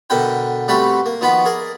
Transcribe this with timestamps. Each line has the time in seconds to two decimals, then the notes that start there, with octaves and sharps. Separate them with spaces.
0.10 B2 D3 A#4 B4 G5
0.68 G3 A3 C4 F#4 G4 B4
1.06 A#3
1.21 D#3 F3 B3 F#4 B5
1.45 G#4 A#4 D5